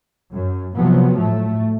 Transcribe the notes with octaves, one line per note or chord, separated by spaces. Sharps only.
F#2
C3 F3 F#3 B3
A2 A3